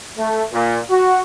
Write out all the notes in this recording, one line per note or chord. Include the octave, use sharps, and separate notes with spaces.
A3
A#2
F#4